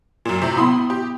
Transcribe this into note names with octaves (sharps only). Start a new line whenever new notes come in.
F#2 A#2
A2 C3
B3 E4 B5 C6 D#6
G4